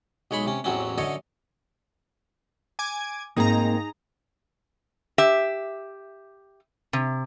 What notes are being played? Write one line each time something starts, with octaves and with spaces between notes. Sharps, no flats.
B1 G#3 C#5 B5 C6
C3 C#4
A1 E2 F#3 C4 C#4
F#2 D3 A4 C#5 D#5
G#5 D6 G#6
G#2 A#3 C4 D#4 G#4 A#5
G4 E5
C3